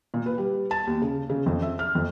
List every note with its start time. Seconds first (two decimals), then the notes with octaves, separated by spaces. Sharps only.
0.14 A#2
0.26 B4
0.38 G3
0.71 A5
0.87 D#2
1.02 C#3
1.30 C#3
1.46 F2
1.62 E5
1.79 F6
1.95 F2